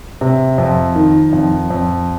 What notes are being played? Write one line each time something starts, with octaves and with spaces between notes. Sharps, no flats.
C3
F2
D#3
F2
F2